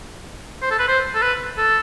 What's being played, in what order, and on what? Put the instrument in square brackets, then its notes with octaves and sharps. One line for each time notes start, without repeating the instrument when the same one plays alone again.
[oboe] C5
A4
B4
C5
A4
B4
A4